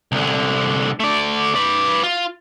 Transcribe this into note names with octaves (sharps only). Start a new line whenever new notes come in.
C2 D3
A3 D5
B4 D5
F4